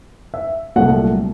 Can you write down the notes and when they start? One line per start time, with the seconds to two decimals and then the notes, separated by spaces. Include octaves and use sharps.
0.34 E5
0.76 C2 A#2 F#3 A3 F#5